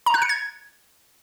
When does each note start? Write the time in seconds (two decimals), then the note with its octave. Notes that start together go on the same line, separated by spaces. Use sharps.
0.06 A#5
0.14 F#6
0.22 C#7
0.29 G#6